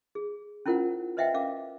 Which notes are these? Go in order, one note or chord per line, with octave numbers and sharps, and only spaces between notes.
G#4
C#4 E4 F4 A#4 C5 F#5
B4 C5 D#5 E5 F#5 G5
C#4 A#4 F5 D6